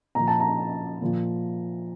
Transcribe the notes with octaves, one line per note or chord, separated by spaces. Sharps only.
A#2 F3 A#5
A5
A#5
A#2 F3